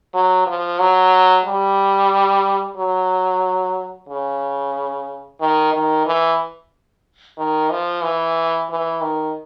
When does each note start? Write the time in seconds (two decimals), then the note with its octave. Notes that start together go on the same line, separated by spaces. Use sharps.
0.14 F#3
0.47 F3
0.80 F#3
1.45 G3
2.77 F#3
4.08 C#3
5.40 D#3
5.73 D#3
6.06 E3
7.38 D#3
7.70 F3
8.03 E3
8.70 E3
9.01 D#3